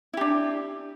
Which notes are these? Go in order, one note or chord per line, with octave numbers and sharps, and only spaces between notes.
D4 E4 G4